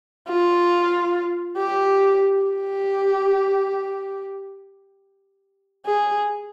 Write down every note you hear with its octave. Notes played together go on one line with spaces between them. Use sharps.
F4
G4
G4
G#4